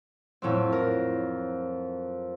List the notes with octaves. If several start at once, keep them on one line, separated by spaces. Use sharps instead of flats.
F2 A2 F#3 C4
A#4